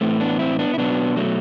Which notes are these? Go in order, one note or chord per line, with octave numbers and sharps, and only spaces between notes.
A2 E3 A3 C4
B3 D4
C4 E4
B3 D4
E4
B2 F#3 B3 D4
F#3 A3